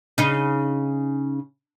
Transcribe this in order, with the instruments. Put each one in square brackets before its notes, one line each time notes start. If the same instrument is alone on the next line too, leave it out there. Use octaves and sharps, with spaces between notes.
[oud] C#3 D#4